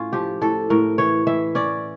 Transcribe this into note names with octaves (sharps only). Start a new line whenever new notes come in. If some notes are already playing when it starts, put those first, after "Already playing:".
Already playing: A2 C#4 F4
F3 G4
A2 A4
A2 A#4
E3 C#5
E3 E5
C#4 D5